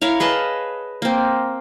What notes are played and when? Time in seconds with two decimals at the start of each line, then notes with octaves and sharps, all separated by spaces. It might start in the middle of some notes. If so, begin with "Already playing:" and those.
0.02 E4 A#4 C#5 F5
0.20 G#4 B4 D#5 A5
1.02 A#3 C4